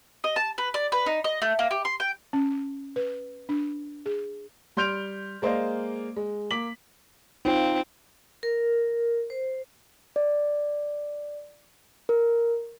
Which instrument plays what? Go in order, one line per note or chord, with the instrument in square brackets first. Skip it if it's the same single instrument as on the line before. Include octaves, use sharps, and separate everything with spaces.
[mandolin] D#5
A5
B4
D5
B4
D#4
D#5
A3
A#3
G4
C6
G5
[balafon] C#4
B4
D4
G#4
[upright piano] G3 C6 F6 G6 D7 F7
G#3 A#3 C5 D5 D#5 F5
G#3
A#3 D6 B6 F#7
[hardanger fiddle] C4 [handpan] D#4 F4
[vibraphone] A#4
C5
[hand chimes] D5
A#4